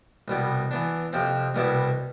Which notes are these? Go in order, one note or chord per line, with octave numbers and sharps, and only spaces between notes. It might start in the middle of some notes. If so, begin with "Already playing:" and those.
C2 B2 G3 B3
E3 B3 D4
F2 C3 F3 C4
C2 B2 G3 B3 E4